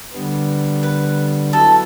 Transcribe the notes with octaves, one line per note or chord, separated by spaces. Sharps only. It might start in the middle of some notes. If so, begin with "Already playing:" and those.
D3 G3 B3
B4
F#3 B3 E4 A4